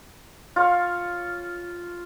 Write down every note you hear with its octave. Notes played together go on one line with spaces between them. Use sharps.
F4 C#5 F5